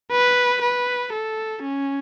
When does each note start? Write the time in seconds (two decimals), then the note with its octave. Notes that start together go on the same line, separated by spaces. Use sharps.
0.12 B4
0.62 B4
1.13 A4
1.64 C#4